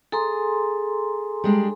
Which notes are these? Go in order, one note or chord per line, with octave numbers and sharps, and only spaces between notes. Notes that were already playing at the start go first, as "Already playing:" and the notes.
G#4 A4 A#5 C6
G3 G#3 D4